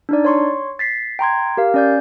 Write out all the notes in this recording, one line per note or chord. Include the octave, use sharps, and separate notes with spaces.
D4 D#4 D5
C#5 C6 C#6
A6 B6 C7
G5 A#5 C6 G#6
G4 A#4 F5
C#4 D5 G6